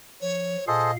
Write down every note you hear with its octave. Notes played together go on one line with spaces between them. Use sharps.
F3 C#5
A#2 G#4 A4 C5 D#5 F5